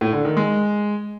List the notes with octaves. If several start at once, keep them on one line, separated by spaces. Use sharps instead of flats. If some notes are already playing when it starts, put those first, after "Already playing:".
A2
D3
D#3
G#3